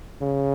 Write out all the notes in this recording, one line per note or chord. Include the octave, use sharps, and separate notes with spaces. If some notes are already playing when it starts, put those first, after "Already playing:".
C#3